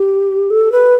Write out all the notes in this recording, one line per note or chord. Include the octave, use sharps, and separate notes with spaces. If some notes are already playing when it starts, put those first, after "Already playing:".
Already playing: G4
A4
B4